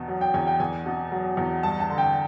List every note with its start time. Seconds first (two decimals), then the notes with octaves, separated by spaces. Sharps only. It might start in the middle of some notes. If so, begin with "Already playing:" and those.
Already playing: E2 B2
0.08 F#3
0.21 G5
0.34 E2 G#5
0.47 G5
0.60 E2 G#5
0.86 B2
1.12 F#3
1.37 E2
1.63 G2 A5
1.80 A5
1.90 D3
1.98 G5